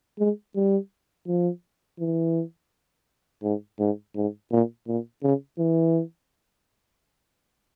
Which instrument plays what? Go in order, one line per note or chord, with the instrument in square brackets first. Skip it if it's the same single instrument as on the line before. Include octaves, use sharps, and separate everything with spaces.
[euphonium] G#3
G3
F3
E3
G#2
G#2
G#2
A#2
A#2
C#3
E3